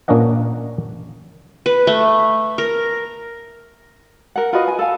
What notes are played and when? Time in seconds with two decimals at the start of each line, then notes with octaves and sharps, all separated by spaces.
0.08 A#2 A#3 C#4 D4 D#5 F#5
1.66 B4
1.87 A3
2.58 A#4
4.36 A#4 F#5
4.53 F4 F#4 B4 D#5
4.68 G#5
4.79 A4 F5 G#5